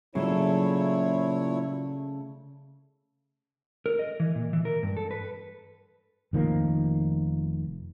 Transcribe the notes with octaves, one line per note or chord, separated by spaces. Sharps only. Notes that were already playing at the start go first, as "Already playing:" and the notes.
A#2 C#3 F#3 A3 E4 A4 C#5
A#4
D#5
E3
A#2
E3
A#4
G2
A4
B4
F1 D#3 F3 A#3